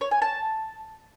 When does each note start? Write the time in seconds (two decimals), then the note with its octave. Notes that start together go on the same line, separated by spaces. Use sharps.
0.01 C#5
0.11 G#5
0.22 A5